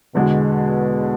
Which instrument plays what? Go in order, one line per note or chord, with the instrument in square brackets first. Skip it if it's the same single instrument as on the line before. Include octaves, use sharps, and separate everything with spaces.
[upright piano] E2 D3 G#3 B3 F#4 [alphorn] B2